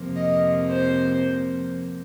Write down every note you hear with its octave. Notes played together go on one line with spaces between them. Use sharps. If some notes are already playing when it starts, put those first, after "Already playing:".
Already playing: F2 C3 F3 A#3
D#5
C5